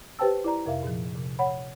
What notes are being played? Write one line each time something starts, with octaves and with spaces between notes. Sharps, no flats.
G4 B4 C5 G5 A5 E6
E4 D5 A#5
F2 C3 A#4 E5 F5
A#2 F3
C3
C#5 F#5 B5